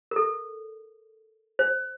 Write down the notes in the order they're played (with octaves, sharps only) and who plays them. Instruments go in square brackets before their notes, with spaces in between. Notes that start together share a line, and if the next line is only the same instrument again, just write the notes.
[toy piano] A#4
A4
C5